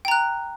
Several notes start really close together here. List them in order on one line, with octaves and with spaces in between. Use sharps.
G5 A#5 F#6